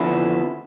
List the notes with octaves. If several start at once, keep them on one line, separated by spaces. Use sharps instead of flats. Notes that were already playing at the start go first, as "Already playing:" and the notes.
Already playing: F2 D3 F3 B3 E4